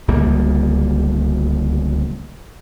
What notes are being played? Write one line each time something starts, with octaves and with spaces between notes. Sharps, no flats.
D1 C#2 G3 A#3